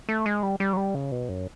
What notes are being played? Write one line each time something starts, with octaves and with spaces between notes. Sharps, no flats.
A3
G#3
G3
G3
F#3
G3
C#3
B2
F#2